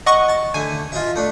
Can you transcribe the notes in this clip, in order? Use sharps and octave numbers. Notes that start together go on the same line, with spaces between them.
D#5 F#5 C#6
A5
D3 A3 G#5
F4 D#5 E5
A3 D4